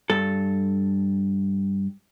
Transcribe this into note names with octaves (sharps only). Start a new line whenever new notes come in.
G2 A4